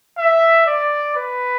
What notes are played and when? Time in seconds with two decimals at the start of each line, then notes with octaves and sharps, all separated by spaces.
0.18 E5
0.66 D5
1.16 B4